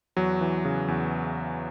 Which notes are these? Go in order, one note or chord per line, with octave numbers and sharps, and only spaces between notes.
E2 F#3
E3
C#3
E2